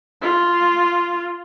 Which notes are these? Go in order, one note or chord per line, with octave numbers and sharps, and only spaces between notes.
F4